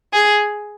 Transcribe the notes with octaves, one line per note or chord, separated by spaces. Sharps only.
G#4